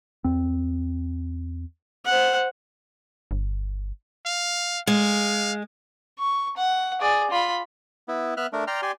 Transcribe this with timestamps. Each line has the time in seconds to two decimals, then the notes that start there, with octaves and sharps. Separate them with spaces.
0.24 E2 C4
2.05 C5 F#5
3.31 G1
4.26 F5
4.87 G#3 F5
6.19 C#6
6.57 F#5
7.00 G#4 D5
7.31 F4 B5
8.08 B3 E4
8.37 B3 E5 F6 F#6
8.53 A3 D4 A#4
8.67 D5 G5 A#5 C6 F6
8.82 G4 D5 G#5 C6